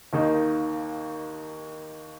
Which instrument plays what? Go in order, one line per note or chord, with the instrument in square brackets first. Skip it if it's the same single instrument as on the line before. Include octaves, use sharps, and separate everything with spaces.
[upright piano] D#2 D#3 A#3 D#4